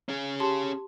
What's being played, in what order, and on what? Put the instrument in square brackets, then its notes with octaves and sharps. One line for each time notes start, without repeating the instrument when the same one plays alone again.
[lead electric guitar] C#4 G#4
[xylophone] G4 A5 C6